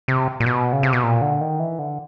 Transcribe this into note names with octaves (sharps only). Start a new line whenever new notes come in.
C3
A#2
B2
C#3
C3
B2
A#2
D3
D#3
E3
D3